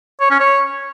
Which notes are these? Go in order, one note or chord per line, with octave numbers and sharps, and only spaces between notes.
C#5
C#4
C#5